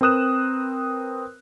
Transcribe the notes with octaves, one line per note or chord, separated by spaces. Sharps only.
C4 A#4 B4 D#6 F#6 E7